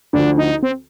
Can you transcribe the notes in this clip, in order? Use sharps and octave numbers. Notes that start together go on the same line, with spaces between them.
D2 D3 F3 D4
D#4
C4